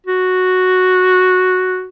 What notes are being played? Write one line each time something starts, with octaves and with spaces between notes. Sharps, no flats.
F#4